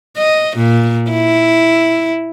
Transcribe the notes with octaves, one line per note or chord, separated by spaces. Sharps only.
D#5
A#2
E4